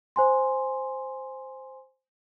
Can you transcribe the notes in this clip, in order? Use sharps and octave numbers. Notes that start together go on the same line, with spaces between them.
C5 G#5 C6